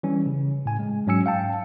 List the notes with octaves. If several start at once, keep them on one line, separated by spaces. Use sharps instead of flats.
E3 G3 C#4
C#3
A2 G#5
G#3
G#2 F#3 C#4 G#5 E6 C#7
F5 G5 A5